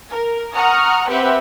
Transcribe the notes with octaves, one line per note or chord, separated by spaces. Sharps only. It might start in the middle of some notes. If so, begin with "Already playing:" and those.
A#4
F#5 A#5 C#6 D#6 F6
C4 G4 B4 E5 F#5 G5